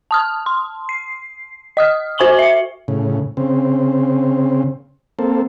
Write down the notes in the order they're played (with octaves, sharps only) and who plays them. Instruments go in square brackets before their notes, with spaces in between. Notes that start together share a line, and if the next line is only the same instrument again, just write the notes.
[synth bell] A5 D#6 F6
C6
C7
D#5 D#6 F6
F#4 C5 G#5 C#6 F#7 G7
E5 C#7
[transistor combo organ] A2 C#3
C#3 C4
A#3 C4 A4